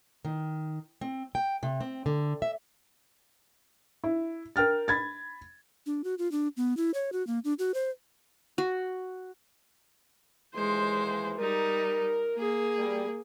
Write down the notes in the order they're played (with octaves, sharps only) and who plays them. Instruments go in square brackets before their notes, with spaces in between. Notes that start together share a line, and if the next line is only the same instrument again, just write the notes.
[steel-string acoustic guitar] D#3
C4
G5
C3
C4
D3
E5
[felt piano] E4
A#4 G5 F6 A6
B5 G#6 A6
[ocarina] D4
F#4
F4
D4
B3
E4
C#5
F#4
A#3
D4
F#4
C5
[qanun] F#4
[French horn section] D#2 E3 [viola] G#3 C5
[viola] G3 D#4 [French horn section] A#4
[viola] A#3 G#4
[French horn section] G3